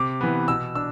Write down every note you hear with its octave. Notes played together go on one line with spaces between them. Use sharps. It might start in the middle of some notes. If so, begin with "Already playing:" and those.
Already playing: C3 D6
E3 B3
B2 E6
D4 E6